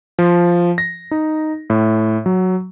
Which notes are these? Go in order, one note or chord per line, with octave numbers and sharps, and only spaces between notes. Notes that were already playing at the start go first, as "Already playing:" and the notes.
F3
A#6
D#4
A2
F#3